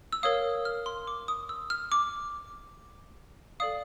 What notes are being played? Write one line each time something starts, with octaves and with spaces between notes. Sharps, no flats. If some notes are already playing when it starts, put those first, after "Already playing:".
E6
A#4 C#5 F5 D#6
F6
C6
D6
D#6
E6
F6
D6
A4 D5 F5 D#6